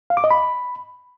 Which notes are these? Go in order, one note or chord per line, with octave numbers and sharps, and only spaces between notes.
F5
D6
D#5
B5